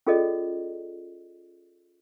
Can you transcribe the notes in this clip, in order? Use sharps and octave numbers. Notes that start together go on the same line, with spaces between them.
C#4 F4 G#4 A4 D5 D#5